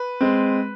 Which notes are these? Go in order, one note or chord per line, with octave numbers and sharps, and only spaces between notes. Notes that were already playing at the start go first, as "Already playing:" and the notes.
Already playing: B4
G#3 C4